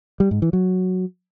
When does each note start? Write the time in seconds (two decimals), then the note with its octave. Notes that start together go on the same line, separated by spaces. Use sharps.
0.20 G3
0.31 G#2
0.42 E3
0.53 F#3